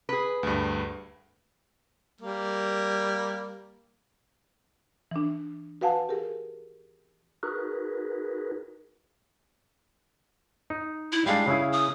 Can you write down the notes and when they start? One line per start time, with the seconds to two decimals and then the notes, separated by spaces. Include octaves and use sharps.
0.09 G#4 B4
0.43 D2 G2
2.21 G3 A#3
5.11 E3 D4
5.81 F#4 B4 F5 F#5 G#5 A5
6.09 G4 G#4 A#4
7.43 D#4 F#4 G#4 A#4 B4
10.70 D#4
11.12 E4
11.26 G3 G#3 D4 F5
11.48 C#3 E4 G#4
11.73 D#6